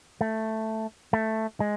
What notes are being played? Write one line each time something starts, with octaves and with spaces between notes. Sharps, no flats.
A3
A3
G#3